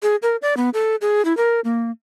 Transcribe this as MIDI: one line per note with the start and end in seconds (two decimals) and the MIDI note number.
0.03 0.16 68
0.22 0.36 70
0.42 0.56 74
0.57 0.70 59
0.74 0.96 69
1.01 1.24 68
1.25 1.35 64
1.37 1.60 70
1.64 1.91 58